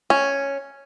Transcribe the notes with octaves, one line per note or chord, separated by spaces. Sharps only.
C#4